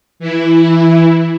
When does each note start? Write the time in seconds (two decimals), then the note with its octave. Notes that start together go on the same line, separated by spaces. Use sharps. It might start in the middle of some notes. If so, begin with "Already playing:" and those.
0.20 E3 E4